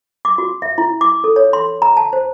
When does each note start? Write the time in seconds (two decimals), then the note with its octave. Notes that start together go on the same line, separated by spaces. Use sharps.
0.25 D6
0.38 F#4
0.62 E5
0.78 E4
1.01 D6
1.24 A4
1.36 C#5
1.53 C6
1.82 A#5
1.97 A5
2.13 C5